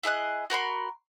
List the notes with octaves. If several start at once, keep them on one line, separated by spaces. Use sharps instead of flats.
E4 G#4 D#5 F#6
F#4 A#4 B5 C6